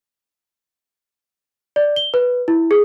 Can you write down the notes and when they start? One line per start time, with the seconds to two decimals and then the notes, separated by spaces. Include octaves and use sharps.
1.76 D5
1.96 G7
2.14 B4
2.48 E4
2.71 G#4